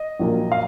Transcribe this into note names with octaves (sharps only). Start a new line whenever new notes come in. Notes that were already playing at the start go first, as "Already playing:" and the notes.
Already playing: D#5
A#1 A#2 F#3 A#3
F5